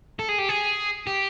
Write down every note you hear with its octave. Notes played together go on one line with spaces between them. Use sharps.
A4
G#4
G4
G#4
G4